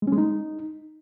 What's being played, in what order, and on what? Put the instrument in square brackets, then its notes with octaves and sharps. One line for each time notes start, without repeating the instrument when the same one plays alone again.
[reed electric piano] G#3
C#4
G#3
D#4